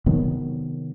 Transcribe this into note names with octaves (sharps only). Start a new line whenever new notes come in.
C3 D#3 F#3 B3